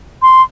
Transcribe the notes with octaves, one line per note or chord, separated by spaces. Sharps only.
C6